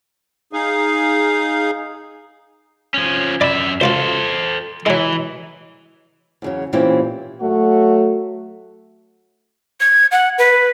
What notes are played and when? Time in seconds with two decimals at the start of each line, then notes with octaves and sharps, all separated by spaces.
0.53 D#4 G#4 F5
2.94 F3 C#4
3.41 F#2 D5 E5 B5
3.81 C#2 F4 F#4 A4 C5
4.86 E3 F#3 G#3
6.42 E2 C#3 F#3
6.73 A#2 E3 C4 C#4 E4 G4
7.41 F#3 A3 F#4
9.80 G#6
10.11 F#5
10.38 B4